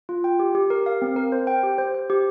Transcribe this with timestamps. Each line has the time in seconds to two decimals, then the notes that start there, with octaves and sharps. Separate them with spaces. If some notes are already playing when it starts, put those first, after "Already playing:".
0.09 F4
0.24 G5
0.40 G4
0.55 G4
0.70 A#4
0.86 F5
1.02 C4
1.16 A#4
1.32 C5
1.47 G5
1.63 G4
1.78 C5
1.95 C5
2.10 G4